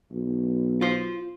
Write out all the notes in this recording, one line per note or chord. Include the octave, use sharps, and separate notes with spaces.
B1
F4 C5